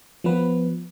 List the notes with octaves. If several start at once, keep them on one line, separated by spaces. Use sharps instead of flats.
F3 B3 B4